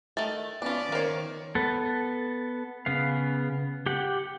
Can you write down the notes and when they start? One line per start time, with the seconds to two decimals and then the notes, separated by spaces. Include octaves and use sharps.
0.17 D#3 A3 A6
0.62 B3 C#4 D4 F4 D5
0.92 D#3 A#3 A#4 C5 C#5
1.55 B3 A4
2.86 C#3 B3 F5
3.86 G4 F#5 G5